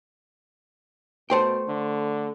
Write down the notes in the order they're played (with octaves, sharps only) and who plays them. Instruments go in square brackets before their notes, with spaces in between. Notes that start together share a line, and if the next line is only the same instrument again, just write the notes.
[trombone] B2 [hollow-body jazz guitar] A3 C5 G5
[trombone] D3